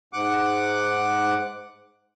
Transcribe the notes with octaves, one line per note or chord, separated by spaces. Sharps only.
G#2 F#5 D6